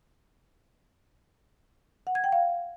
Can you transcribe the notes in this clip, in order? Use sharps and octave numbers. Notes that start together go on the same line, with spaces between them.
F#5
G#6
G5
F5